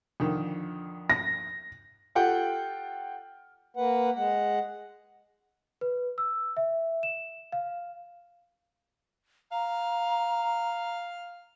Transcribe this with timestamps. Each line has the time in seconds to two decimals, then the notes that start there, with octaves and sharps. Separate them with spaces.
0.20 F2 D3 D#3
1.10 A#6
2.15 F4 G4 A4 F#5 G5
3.77 A#3 B4 F#5
4.15 G#3 F#5
5.81 B4
6.18 E6
6.57 E5
7.03 E7
7.52 F5
9.52 F5 A#5